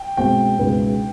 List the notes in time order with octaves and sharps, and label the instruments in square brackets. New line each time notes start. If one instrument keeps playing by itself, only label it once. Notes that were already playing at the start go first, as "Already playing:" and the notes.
Already playing: [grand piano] G5
[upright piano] B2 G#3 C4 [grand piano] G5
[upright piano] C#2 B2 G#3 B3 D#4